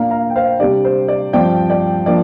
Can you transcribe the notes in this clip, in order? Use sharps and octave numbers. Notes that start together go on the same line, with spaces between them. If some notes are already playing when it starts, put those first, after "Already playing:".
Already playing: A#2 A#3 D4 F5 A#5
F5 A#5
G5
C5 F5
C3 G3 D4 D5
C5
D5
G2 F3 C4 D5 G5
D5 G5
F3 A#3 D4 D5